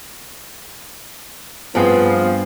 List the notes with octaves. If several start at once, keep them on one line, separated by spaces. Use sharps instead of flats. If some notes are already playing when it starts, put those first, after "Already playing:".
G2 F3 B3 C4 G#4 B4